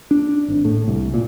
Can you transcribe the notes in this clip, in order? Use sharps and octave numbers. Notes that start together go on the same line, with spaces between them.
D4
G#1
A2
C2
A#2